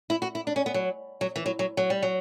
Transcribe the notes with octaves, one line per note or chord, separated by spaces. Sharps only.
E4
F#4
E4
D4
C#4
B3
F#3
F#3
E3
F#3
F#3
F#3
G3
F#3